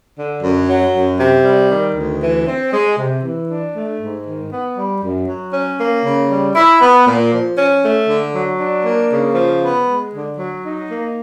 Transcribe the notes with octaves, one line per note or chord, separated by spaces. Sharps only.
D3
F#2
F#3
F#2
C3
G3
D#3
D2
E3
C4
G#3
C3
E3
D4
A3
G#2
D#3
B3
G3
F#2
F#3
C#4
A#3
C#3
G3
E4
B3
A#2
F3
C#4
A3
D3
F#3
D4
A#3
C#3
F3
B3
G#3
D3
F#3
D#4
A#3